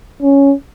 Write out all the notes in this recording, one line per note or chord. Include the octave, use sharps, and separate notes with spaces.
C#4